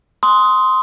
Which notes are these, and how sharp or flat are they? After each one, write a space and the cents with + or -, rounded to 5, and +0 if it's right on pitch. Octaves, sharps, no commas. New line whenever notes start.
C6 -5 D#6 +15